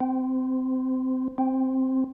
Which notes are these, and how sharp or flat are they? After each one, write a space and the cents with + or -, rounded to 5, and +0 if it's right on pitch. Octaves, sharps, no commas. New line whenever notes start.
C4 -20
C4 +0